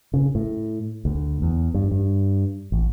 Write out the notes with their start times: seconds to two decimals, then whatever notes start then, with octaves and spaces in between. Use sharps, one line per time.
0.14 C#3
0.35 A2
1.05 D2
1.42 E2
1.74 G2
1.92 G2
2.72 A1